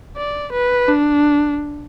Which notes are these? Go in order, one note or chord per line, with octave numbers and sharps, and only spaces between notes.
D5
B4
D4